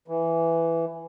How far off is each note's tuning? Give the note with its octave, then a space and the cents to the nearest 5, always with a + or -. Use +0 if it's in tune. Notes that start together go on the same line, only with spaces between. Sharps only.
E3 +10